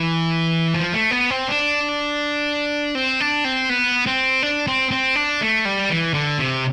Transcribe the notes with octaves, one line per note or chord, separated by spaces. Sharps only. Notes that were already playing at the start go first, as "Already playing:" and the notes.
Already playing: E3
F3
A3
B3
C4
D4
C4
D4
C4
B3
C4
D4
C4
C4
D4
A3
G3
E3
D3
C3